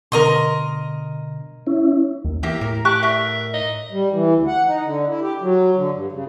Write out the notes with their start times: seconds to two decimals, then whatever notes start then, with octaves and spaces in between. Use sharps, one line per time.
0.12 B2 D3 A#4 D#5 C6
1.67 C#4 E4
2.25 D#2
2.43 E2 A#3 G4 E5
2.61 A2 A#4
2.85 G4 A5 C#6 F#6
3.03 A#4 E5
3.54 D#5
3.92 G3
4.11 E3
4.34 D2
4.47 F#5
4.67 D#4
4.84 D3
5.08 E4
5.20 G4
5.41 F#3
5.76 D3
5.91 G2
6.12 C#3